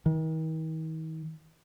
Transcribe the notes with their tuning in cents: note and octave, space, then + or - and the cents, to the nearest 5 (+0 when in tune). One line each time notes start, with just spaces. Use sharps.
D#3 +40